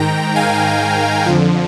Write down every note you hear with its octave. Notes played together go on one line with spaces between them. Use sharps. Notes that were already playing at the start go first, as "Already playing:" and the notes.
Already playing: G#2 D#3 G5 A#5
F5 G#5
F2 D3 F3